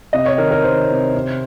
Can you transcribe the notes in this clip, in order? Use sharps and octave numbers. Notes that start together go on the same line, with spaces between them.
C3 D#5
C#5
D#3 A#4
A#4
D#3 C5
C3
C3